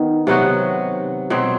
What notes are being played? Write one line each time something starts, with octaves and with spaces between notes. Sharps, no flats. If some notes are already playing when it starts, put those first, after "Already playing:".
Already playing: D#3 B3 D#4
C3 F#3 B3 F#4
B2 F#3 C4